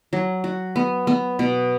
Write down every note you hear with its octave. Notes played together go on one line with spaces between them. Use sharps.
F#3
F#4
B3
B3
B2